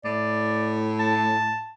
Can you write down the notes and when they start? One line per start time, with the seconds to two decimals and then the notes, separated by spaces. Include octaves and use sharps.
0.05 A2 D5
0.99 A5